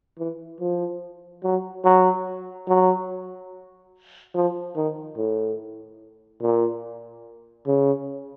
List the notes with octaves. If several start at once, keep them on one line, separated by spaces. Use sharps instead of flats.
E3
F3
F#3
F#3
F#3
F3
D#3
A2
A#2
C#3